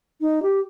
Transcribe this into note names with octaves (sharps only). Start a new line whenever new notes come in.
D#4
G4